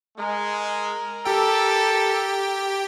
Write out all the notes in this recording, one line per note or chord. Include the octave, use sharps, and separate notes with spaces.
G#3 A#4
G4 A4 G5